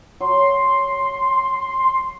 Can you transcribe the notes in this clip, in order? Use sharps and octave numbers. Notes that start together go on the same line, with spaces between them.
F#3 C6